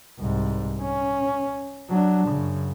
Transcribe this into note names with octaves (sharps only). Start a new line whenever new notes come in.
C2 G#2
C#4
F#3 D4
F#2 C#3